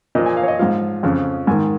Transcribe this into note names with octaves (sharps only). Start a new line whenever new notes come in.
A#2 F3 D#5
G#5
F5
C#5
D#5
G#2 F3 F5
F2 C#3 F3
G#2 D#3 G#5